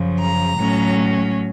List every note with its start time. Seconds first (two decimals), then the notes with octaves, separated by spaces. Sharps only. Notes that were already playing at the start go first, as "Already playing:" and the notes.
Already playing: F#2 C#3 F3
0.19 A#5
0.57 A2 F#3 A3 C#4